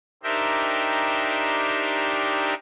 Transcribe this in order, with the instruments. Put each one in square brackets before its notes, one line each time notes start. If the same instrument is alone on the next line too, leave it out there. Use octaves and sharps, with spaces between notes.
[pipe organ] D4 D#4 G4 A#4 C5 E5